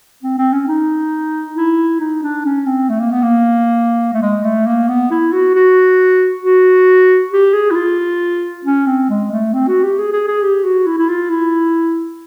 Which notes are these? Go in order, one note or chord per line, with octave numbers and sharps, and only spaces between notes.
C4
C4
C#4
D#4
E4
D#4
D4
C#4
C4
A3
A#3
B3
A#3
A3
G#3
A3
A#3
B3
E4
F#4
F#4
F#4
G4
G#4
E4
F4
C#4
C4
G#3
A3
C4
F#4
G4
G#4
G#4
G#4
G4
F#4
E4
E4
F4
E4